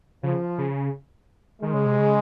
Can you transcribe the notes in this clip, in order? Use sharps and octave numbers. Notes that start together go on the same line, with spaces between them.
C#3 F3
C#3
D#3 G#3
C#3
C3
C#3